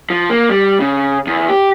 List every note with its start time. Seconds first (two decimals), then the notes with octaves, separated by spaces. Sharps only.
0.10 F3
0.30 A#3
0.49 G3
0.80 C#3
1.27 E2
1.49 G4